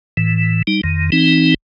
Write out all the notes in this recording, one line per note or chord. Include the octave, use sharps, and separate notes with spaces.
A2 E3
G3 D#4
F2 D#3
E3 C4 D#4